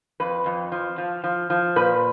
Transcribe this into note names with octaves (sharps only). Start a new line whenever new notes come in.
F2 B4
F2
F3
F3
F3
F3
A#2 B4